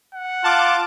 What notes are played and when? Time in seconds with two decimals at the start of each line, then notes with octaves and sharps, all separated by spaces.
0.14 F#5
0.44 F4 A5 D6